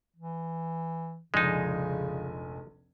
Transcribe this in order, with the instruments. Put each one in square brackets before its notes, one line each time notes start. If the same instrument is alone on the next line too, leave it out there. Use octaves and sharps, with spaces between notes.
[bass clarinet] E3
[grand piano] F1 A#1 G#5 [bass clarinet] C#3 [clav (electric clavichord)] G#3 D#4